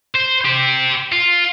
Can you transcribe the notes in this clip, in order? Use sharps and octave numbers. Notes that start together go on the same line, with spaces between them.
C5
G4 C5
F4